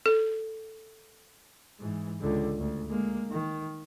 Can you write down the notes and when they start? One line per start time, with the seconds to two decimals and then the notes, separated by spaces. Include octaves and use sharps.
0.06 A4
1.80 G#2 E3
2.21 C#2 D3
2.59 D2
2.89 G#3 A#3
3.31 D#3